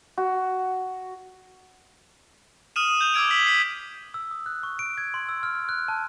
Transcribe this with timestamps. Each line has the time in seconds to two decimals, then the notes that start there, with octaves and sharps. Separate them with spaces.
0.18 F#4
2.76 D#6 F6 D#7 E7
3.01 G6 F7
3.14 D6 E6 G#6 D7
3.31 E6 B6 F#7
3.47 B6 C7
4.14 E6
4.31 D#6
4.46 F#6
4.63 C#6
4.79 D7
4.98 G#6
5.14 C6
5.29 E6
5.43 F6
5.55 F6
5.69 F#6
5.88 A5